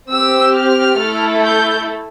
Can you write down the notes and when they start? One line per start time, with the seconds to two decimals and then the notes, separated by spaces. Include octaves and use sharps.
0.11 C4 G4 E6
0.55 F6
0.99 A3 E4 A4
1.43 G6